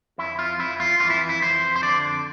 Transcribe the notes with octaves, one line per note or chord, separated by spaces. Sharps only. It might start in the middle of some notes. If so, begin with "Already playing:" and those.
F2 E4
F4
F2 E4
F4
E3 F4
E4
E4
F2 C5
C5
D3 D5